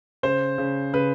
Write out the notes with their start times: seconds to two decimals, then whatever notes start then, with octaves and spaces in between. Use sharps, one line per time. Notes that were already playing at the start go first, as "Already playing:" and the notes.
0.23 C#3 C5
0.58 C#3
0.93 C#3 B4